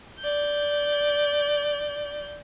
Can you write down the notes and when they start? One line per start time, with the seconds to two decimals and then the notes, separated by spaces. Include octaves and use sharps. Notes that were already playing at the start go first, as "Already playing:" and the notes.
0.20 D5 G6